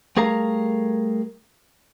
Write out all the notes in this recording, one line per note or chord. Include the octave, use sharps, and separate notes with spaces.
G3 A3 G#4 A#4 F5 A#5